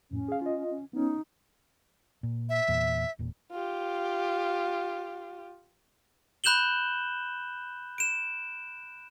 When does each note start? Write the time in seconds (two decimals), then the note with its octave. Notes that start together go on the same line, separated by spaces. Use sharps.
0.11 F2 A2 C#4
0.28 G#4 F5
0.41 F4 D#5
0.70 C#4
0.93 B3 C#4 D#4
2.23 A#2
2.49 E5
2.68 E2 A#2
3.19 E1 A#2
3.51 F4 G4
6.44 B5 F#6 G6 E7 F#7 G7
7.98 D7 E7